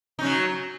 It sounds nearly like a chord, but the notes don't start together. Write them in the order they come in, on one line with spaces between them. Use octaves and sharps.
D#4 C#4 F#3